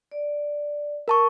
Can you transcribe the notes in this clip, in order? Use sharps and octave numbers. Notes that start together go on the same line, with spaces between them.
D5
A#4 A5 C#6